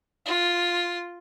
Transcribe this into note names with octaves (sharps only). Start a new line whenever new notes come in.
F4